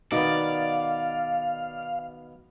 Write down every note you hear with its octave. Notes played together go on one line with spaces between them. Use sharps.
B2 D#3 B3 D#4 D5 F5